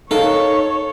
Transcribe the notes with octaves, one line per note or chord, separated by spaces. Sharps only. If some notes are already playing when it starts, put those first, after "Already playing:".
D#4 A4 A#4 C#5 F5